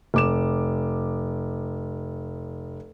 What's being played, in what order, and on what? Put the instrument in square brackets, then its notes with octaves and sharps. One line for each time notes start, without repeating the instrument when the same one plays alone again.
[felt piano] F1 D6 E7